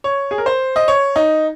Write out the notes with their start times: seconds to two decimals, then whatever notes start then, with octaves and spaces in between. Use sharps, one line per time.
0.04 C#5
0.31 G#4
0.38 A#4
0.46 C5
0.76 D#5
0.88 C#5
1.16 D#4